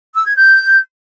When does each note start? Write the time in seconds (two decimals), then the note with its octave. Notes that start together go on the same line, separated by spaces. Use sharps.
0.14 E6
0.25 G#6
0.36 G6